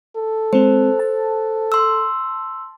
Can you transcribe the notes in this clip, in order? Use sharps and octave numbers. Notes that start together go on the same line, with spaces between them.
A4
G#3 C4 C5
A5
C6 E6